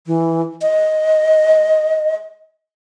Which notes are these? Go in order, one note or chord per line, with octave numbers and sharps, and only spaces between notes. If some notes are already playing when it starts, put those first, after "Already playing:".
E3
D#5